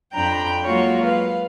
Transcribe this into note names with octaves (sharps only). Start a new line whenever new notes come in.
F2 D4 G5 A#5 B5 G6
F#3 G#3 A#3 F4 F#4 C#5
B4 F5